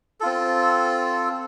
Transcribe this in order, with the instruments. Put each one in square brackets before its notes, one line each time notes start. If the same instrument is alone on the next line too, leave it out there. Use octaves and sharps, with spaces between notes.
[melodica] C4 F4 A4